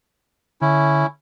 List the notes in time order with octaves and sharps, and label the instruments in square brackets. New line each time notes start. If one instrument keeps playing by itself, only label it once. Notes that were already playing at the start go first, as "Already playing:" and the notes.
[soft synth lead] D3 [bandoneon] C#4 E4